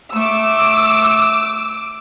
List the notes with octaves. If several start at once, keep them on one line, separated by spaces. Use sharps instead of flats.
A3 D6 E6